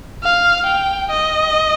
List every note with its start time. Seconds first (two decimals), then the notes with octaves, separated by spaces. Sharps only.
0.23 F5
0.67 G5
1.11 D#5